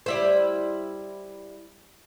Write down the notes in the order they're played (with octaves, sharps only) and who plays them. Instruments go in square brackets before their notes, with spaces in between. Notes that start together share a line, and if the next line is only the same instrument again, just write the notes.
[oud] G3 E4 C5